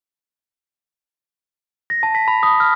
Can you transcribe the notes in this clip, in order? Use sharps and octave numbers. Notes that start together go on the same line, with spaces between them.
A#6
A5
B6
B5
D#6
F6